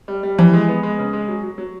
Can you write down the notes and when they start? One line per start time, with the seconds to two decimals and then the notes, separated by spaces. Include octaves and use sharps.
0.08 G3
0.23 G3
0.38 E3 F3
0.53 G#3
0.68 B3
0.83 G#3
0.99 C#3
1.13 G#3
1.28 F#3
1.43 F#3
1.58 F#3